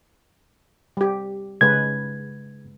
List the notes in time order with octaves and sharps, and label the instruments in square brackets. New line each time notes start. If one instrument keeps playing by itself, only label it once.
[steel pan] G3 G4
[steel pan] C#3 G#3 B4 [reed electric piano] G#6